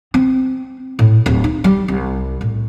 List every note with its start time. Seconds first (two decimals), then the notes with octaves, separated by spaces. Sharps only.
0.14 C4
0.99 A2
1.26 D1
1.44 D#4
1.64 G3
1.88 C2
2.41 A2